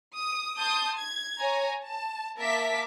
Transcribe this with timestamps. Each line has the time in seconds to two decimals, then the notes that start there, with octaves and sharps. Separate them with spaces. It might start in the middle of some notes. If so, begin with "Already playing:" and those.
0.16 D#6
0.58 A5 C6 D#6 G6
0.98 G#6
1.39 C#5 G#5 A#5
1.82 A5
2.38 A#3 A#4 E5 A5 D6 B6